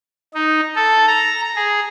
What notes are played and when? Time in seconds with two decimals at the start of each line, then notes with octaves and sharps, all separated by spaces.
0.34 D#4
0.76 A4
1.07 A#5
1.56 G#4